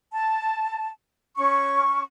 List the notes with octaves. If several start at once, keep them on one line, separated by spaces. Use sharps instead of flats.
A5
C#4 C#6